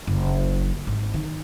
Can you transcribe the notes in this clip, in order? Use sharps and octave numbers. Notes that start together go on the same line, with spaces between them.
F#1
G#1
D#3